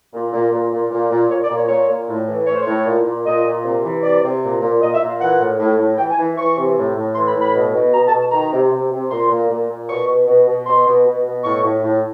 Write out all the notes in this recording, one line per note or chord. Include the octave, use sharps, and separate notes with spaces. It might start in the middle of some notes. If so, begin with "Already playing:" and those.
A#2
A#2
A#2
A#2
A#2
A#2
A#2 C#5
D5
A#2
C#5
A#2 C#5
A#2
A2
E3
A2 C#5
C5
A2 C#5
A#2
A#2
A#2 D#5
A#2
C3
E3
C3 D5
C3
A#2
A#2
A#2 D#5
E5
A#2
F5
E3 F#5
A2
A2
A2
E3 G5
G#5
E3
E3 C#6
C3
A2
A2
E3 C6
B5
A2
B5
B2
B2
B2 A#5
A5
B2
A5
D#3 A#5
C3
C3
C3
A#2 C6
A#2
A#2
A#2
B2 C#6
B2
B2
B2
B2 C6
B2
B2
B2
A2 C#6
A2
A2